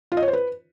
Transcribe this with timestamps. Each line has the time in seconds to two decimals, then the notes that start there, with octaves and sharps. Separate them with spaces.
0.12 F4
0.17 D#5
0.22 C#5
0.28 C5
0.33 B4